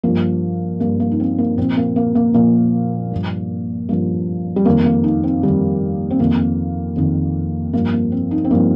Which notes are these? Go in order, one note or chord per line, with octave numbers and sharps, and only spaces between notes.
G2 F3 A#3
G2 F3 A#3
A#3
D#4
C4
A#3
A#2 F3 C4
A#3
A#3
A#3
A#2 F3 A#3
G2 F3
G2 F3 A#3
G3
F2 D#3 A#3
A#3
D#4
C4
F2 D#3 G3
C4
F2 D#3 A#3
F2 D#3
G2 F3 A#3
A#3
C4
D#4
C4
G2 F3 A#3